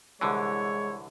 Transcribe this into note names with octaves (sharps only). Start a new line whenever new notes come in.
C2 D3 E3 G#3 C#5